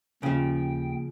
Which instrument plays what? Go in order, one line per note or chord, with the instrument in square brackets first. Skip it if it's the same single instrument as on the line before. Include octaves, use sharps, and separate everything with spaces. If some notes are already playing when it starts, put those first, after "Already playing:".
[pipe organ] D#2 G5 [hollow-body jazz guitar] C#3 F3